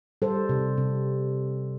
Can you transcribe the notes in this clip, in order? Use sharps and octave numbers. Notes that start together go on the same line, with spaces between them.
G3 A4 C5
C3
C3